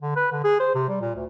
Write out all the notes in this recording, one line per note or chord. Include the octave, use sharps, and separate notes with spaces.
D3
B4
D3
G#4
C5
C3
G3
A#2
D2